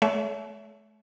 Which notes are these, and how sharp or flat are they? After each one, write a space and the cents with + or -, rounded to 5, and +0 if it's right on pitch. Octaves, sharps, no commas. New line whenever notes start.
A3 -45 C#5 +30 E5 +0